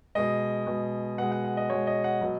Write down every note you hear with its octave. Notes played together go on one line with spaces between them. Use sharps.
B2 G#3 D#5
B2 G#3
B2 G#3 F#5
F#5
F#5
D#5
B2 G#3 C#5
D#5
F#5
B2 F#3 D#5